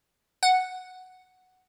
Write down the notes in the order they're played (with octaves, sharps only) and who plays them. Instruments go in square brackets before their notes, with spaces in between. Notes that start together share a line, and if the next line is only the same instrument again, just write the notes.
[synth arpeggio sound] F#5